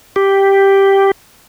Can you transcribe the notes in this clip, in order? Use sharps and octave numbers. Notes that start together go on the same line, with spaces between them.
G4